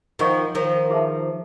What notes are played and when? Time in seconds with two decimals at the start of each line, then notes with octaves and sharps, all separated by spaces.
0.19 D#3 F3 A#4 D#5 F#5 A#5 C#6
0.55 D#3 F3
0.89 E4 G#4 B4 E5 A5